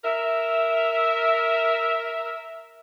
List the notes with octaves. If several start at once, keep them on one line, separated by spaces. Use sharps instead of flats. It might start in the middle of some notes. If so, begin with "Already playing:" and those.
A#4 E5